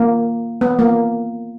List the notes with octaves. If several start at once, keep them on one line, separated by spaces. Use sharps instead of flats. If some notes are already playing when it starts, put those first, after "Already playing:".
Already playing: A#3
B3
A#3